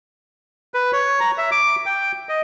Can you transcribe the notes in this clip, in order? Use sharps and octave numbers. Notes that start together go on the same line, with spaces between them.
B4
C#5
A#5
E5
D6
G5
D#5